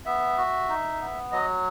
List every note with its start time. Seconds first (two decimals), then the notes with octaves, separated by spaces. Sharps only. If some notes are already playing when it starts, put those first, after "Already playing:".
0.06 B3 E5
0.38 F#4
0.69 D#4
1.01 B3
1.32 F#3 D#5